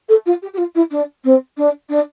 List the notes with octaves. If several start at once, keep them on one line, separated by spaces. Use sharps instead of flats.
A4
F4
G4
G4
F4
E4
D4
C4
D4
D4